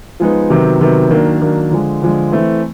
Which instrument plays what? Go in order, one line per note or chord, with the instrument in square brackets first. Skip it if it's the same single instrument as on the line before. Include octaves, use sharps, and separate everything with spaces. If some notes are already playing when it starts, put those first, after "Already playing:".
[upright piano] F3 G#3 B3 D#4
C3 D#3 F#3 B3
C3 D#3 F#3 B3
D#3 F#3 A#3 D4
D#3 F#3 A#3 D4
D3 F3 G#3
D3 F3 G#3
E3 A3 C4